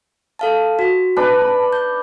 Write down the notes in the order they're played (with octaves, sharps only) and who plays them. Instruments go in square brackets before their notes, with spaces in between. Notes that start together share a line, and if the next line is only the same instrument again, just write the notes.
[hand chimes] A4 F5 A5
F#4
[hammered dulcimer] D4 B4 [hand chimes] A5
[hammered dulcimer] B5
[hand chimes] G6